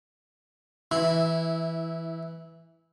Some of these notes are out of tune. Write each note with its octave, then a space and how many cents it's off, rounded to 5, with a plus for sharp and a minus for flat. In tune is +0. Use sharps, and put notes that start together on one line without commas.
E3 +0 E4 -20